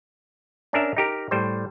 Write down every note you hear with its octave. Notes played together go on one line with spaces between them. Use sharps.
C#4 D4 A#4 E5
D#4 G4 A#4
A2 G3 C5